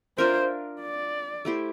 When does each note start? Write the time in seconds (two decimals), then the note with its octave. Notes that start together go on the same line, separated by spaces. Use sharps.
0.18 D4 F4 A#4 C5 E5
0.82 D5
1.45 A3 E4 G4 C5